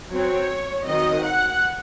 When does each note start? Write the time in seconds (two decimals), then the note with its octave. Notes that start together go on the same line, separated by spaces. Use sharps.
0.12 F#3 C4 C#5
0.86 D#3 F#3 C4 D#5
1.24 F#5